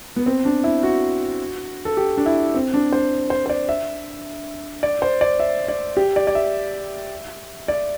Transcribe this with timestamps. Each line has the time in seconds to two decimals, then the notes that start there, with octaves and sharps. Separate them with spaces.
0.16 B3
0.26 C4
0.45 D4
0.64 E4
0.83 F#4
1.85 A4
1.97 G4
2.17 D4
2.26 E4
2.54 C4
2.74 D4
2.93 C5
3.30 C5
3.46 C5
3.49 D5
3.69 E5
4.83 D5
5.02 C5
5.21 D5
5.40 E5
5.68 D5
5.97 G4
6.16 D5
6.27 D5
6.35 E5
7.68 D5